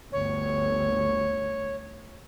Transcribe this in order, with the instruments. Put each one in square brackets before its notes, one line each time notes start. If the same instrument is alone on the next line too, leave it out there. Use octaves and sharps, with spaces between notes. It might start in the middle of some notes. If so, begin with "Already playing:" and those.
[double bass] G1 D2 [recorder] C#5